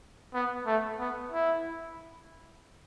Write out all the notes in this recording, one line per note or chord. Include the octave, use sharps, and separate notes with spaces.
B3
A3
B3
E4